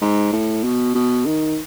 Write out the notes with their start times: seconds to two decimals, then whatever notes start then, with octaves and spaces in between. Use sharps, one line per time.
0.02 G#2
0.33 A2
0.64 B2
0.95 B2
1.26 D#3